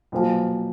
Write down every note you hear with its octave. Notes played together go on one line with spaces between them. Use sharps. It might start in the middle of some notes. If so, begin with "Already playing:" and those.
B1 A#2 F3